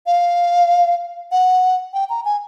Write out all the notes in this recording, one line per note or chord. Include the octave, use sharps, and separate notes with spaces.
F5
F#5
G5
A#5
G#5